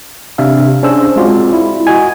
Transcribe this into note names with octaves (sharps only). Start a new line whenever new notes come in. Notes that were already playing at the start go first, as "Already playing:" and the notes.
C3 D4 E5 F5
C#4 D4 G#4 C5 E6
G#3 C4 F4 F#4 D5
E4
F#4 D#5 G#5